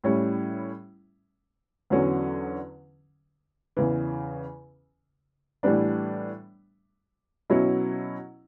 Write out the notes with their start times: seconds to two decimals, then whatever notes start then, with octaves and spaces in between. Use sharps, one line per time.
0.04 A2 G3 C#4 E4
1.90 E2 D3 F#3 C#4
3.77 E2 C#3 E3
5.63 A2 E3 G3 B3 D4
7.50 B2 F#3 C#4 E4